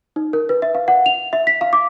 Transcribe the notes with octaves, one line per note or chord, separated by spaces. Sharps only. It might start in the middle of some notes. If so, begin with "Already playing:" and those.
D#4
A#4
B4
E5
F5
F#5
F7
E5
B6
F5
D6